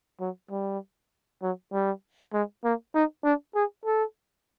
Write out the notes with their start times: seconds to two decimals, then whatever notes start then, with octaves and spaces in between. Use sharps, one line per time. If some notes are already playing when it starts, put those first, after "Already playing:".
0.20 F#3
0.51 G3
1.42 F#3
1.73 G3
2.33 G#3
2.64 A#3
2.95 D#4
3.24 D4
3.55 G#4
3.86 A4